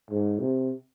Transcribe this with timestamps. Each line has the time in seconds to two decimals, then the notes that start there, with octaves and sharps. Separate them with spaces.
0.11 G#2
0.39 C3